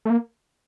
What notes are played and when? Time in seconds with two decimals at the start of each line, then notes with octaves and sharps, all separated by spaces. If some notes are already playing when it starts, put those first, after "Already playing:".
0.05 A3
0.10 A#3